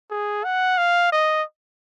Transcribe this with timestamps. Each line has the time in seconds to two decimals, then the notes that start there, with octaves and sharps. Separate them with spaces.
0.10 G#4
0.44 F#5
0.78 F5
1.12 D#5